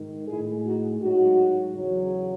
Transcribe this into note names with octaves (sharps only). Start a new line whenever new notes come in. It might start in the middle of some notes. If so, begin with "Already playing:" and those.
Already playing: G#2 D#3
A2 G#3 E4 G#4
D#4 F#4
G#2 F#3 D#4 F#4
E2 C#3 F#3